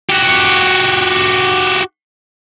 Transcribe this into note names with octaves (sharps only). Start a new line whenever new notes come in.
F#4 G4